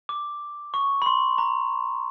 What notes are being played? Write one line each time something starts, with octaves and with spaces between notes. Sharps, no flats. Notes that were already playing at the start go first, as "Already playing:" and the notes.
D6
C#6
B5
C6
A#5